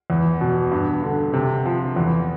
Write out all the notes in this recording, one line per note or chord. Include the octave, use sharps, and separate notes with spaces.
E2
B2
G2
D3
C3
F3
E2